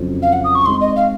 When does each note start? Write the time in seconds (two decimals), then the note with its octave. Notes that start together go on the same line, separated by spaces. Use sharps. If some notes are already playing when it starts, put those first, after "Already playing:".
Already playing: F2 C#3 F#3
0.22 F5
0.33 F#5
0.44 D#6
0.55 C#6
0.66 G#3 C4 D#4 C6
0.81 D#5
0.96 F5